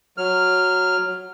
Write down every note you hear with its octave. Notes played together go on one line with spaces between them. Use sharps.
F#3 F6